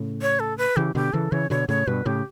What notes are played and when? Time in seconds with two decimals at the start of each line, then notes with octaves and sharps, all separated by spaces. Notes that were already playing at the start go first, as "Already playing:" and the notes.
Already playing: A2 C#3
0.22 C#5
0.40 A4
0.58 B4
0.76 C#3 E3 G4
0.95 B2 D3 G4
1.13 C#3 E3 A4
1.32 C#3 E3 C#5
1.50 B2 D3 C#5
1.69 A2 C#3 C#5
1.87 G2 B2 B4
2.05 A2 C#3 G4